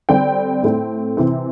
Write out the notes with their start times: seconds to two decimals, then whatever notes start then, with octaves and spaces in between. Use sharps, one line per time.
0.09 D3 G3 C4 G5
0.63 A2 A3 C4
1.17 C3 E3 C4